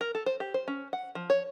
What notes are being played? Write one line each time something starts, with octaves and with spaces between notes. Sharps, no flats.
A#4
A4
C5
G4
C5
C#4
F#5
F3
C#5